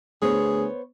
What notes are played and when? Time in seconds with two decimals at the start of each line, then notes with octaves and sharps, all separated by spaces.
0.22 D2 B3 G#4 C5 C#5